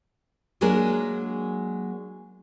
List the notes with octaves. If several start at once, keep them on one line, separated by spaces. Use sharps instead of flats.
F#3 G#3 A#3 D4 G#4 A#4